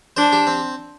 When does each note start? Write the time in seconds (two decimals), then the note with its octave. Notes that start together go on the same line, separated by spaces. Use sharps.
0.17 D4 C5
0.33 G4
0.47 C4